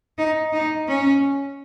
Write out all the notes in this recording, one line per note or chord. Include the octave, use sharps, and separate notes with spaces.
D#4
D#4
C#4